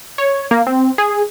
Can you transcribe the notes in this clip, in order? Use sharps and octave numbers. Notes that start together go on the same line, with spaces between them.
C#5
A#3
C4
G#4